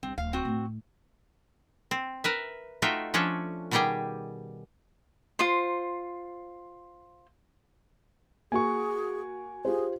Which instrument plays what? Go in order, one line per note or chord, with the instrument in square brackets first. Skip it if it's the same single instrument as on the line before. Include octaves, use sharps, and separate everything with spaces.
[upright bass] C2 [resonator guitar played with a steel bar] C4
[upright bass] D1 [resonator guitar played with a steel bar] F5
[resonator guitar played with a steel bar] C4 F#4
[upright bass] A2 A3
[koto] C4
A#4 B4 E5
A3 D#4 F4 F#4 E5 G5
F3 C#4 D4 A4 C#5
B2 D#3 G3 G4 G#4 G5
[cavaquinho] F4 C5 C6
[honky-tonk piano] A#3 F#4 [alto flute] G#4 [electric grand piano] G#5 C#6
[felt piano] F4 G4 C5 [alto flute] G#4